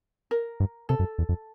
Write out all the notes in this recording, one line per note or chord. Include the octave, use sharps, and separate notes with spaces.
A#4
G2
C3 A4
F#2
E2
F2